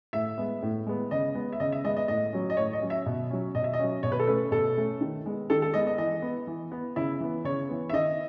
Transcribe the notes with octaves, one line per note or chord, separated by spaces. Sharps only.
A2 E5
G#3 B3
A2
G#3 B3
C#3 D#5
G#3 B3
E5
C#3 D#5
E5
G#3 B3 D#5
D#5
A2 D#5
F#3 C#4
D#5
A2 C#5
D#5
F#3 C#4
E5
B2
F#3 C#4
B2 D#5
E5
D#5
F#3 C#4
B2 C#5
B4
A4
A3 C#4 B4
B2 A4
A3 C#4
D#3
G#3 B3
D#3 A4
A4
G#3 B3 D#5
D#5
E3 D#5
B3
E3
B3
C#3 E4
E3 B3
C#3 C#5
E3 B3
E5
D#3 D#5